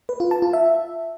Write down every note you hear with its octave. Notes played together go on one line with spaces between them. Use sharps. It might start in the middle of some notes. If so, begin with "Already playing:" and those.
B4
F4
A5
F4
E5